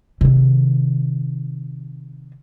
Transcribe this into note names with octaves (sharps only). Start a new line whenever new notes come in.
C3 D#3